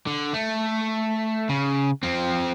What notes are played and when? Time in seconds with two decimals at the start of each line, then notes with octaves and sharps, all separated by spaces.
0.07 D3
0.33 A3
1.49 C#3
2.03 F3 C4